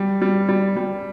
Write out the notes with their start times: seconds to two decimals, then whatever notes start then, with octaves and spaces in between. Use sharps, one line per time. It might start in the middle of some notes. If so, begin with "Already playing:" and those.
Already playing: G3
0.22 G3
0.49 G3
0.77 G3